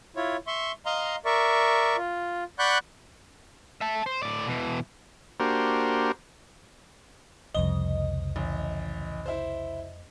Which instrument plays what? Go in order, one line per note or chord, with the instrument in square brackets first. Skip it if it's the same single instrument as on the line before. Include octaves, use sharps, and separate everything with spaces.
[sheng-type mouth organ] E4 F4 C#5
E5 C6 C#6
D#5 F5 A#5 C6
A#4 D5 E5 C#6
F4
D5 F#5 B5 C#6 F#6 G6
[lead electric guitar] E5 A5
C5
A2 D5
B2 E3
[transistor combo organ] A#3 D4 F#4 G4 A#4 C5
[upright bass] C2 C#3 [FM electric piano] F2 D#5 [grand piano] G7
[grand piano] A1
E4 C5